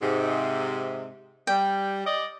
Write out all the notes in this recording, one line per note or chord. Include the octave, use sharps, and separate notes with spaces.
G#2 C3
G3 G5
D5 D#5